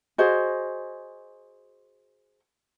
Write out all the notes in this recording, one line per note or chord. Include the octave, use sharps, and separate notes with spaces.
F#4 G#4 C5 D#5